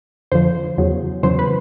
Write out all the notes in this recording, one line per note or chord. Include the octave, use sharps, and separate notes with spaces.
F2 D3 F3 C5
E2 C#3 F#3
E2 C#3 F#3 C5
B4